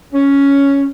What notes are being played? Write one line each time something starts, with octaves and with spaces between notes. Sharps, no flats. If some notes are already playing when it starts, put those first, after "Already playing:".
C#4